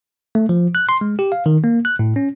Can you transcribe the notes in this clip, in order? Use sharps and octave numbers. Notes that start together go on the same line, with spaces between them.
A3
F3
F#6
C6
G#3
G4
F5
D#3
A#3
F#6
A2
C#4